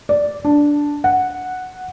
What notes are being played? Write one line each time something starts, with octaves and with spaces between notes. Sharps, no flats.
D5
D4
F#5